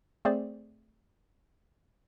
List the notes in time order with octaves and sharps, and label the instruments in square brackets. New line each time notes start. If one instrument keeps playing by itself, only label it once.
[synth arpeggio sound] A3 C4 G#4 C5 D5